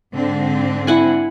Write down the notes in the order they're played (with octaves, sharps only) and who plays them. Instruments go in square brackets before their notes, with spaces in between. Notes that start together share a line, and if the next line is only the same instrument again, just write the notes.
[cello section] G#2 D3 C4
[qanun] E4 F#5 G#5